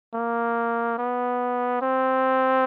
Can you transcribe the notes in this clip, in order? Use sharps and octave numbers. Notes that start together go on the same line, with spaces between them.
A#3
B3
C4